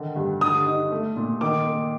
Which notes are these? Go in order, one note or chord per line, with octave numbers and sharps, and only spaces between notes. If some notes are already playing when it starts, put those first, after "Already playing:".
Already playing: D3 D#3
G2
D3 D#6
D#4
A3
A#2
D#3 D6
A#3